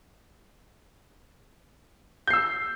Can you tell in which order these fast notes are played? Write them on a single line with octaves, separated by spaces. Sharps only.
G6 C7 E6